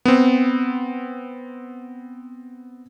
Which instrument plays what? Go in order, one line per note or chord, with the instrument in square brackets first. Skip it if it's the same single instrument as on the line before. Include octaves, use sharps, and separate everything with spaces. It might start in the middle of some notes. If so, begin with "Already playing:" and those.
[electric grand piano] B3 C4